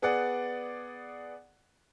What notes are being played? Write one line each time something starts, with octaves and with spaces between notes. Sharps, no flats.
B3 G#4 D5 F#5